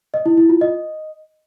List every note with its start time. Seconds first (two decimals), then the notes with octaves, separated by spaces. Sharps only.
0.14 D#5
0.26 E4
0.37 E4
0.49 F4
0.61 D#5